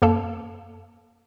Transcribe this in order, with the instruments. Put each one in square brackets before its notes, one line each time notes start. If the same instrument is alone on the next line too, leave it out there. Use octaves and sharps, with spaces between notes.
[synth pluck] F#2 A#3 A4 A5